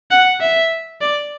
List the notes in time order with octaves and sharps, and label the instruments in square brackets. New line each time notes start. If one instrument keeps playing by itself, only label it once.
[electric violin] F#5
E5
D5